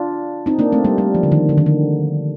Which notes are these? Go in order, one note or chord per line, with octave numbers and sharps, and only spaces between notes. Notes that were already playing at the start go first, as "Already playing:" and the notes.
Already playing: D4 F4
C4 D#4
A#3 D4
A3 C4
G3 A#3
G3
F3
D3
D#3
D3
D#3
D3